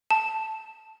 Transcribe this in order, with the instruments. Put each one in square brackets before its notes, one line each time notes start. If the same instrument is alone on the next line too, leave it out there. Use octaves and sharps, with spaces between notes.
[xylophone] A5